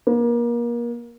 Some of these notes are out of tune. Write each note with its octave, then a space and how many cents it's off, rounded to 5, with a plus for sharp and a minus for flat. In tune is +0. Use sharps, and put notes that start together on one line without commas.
A#3 +30